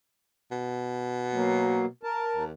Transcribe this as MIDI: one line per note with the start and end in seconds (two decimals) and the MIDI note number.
0.51 1.89 47
1.33 1.86 54
1.33 1.86 58
2.03 2.44 70
2.03 2.44 81
2.36 2.52 39